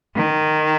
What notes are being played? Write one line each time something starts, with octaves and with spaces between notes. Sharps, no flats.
D#3